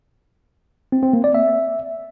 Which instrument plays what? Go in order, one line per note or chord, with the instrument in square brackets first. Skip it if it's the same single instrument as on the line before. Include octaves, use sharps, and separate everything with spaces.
[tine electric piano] C4
C4
A#3
D5
E5